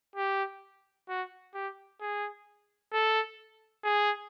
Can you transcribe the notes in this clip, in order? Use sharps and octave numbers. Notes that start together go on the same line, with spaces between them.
G4
F#4
G4
G#4
A4
G#4